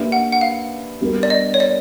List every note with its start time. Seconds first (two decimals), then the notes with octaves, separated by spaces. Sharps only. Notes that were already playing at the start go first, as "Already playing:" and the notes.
Already playing: A#3 D4 G4 B4 E5
0.12 F#5
0.32 F#5
0.41 F5
1.01 G3 B3 D4 G4 A#4
1.23 D5
1.30 D#5
1.54 C#5
1.60 D5